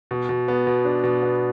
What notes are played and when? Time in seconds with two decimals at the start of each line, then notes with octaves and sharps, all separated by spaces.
0.11 B2
0.29 B2
0.48 B3
0.67 B2
0.85 D4
1.04 B2
1.23 B3